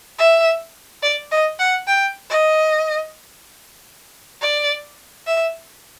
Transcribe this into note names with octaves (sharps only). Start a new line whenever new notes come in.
E5
D5
D#5
F#5
G5
D#5
D5
E5